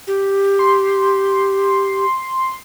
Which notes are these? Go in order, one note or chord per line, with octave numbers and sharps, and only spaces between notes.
G4
C6